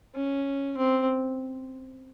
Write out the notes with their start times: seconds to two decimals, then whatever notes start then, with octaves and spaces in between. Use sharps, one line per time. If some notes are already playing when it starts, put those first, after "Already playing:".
0.15 C#4
0.77 C4